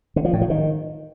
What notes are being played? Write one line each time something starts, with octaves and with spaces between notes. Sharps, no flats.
D3
F3
A2
F3
D#3